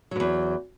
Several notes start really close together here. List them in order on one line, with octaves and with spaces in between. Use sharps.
F#3 G#2 E2